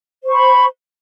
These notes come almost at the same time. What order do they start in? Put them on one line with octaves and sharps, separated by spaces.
C5 C#6 B5